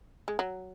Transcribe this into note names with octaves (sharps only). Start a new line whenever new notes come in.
G#3
F#3